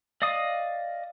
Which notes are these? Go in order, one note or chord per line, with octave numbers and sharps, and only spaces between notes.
D5 D#5 F5 D#6